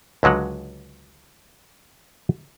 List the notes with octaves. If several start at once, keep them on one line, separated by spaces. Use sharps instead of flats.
C#2 D3 F#3 G#3 F#5